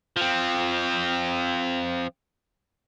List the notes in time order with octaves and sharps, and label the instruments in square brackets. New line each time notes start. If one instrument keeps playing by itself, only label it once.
[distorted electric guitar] F3 C4